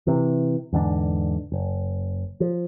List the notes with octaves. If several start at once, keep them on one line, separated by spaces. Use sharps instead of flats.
C3 E3
E2 G#2 D3 D4
F#1
F3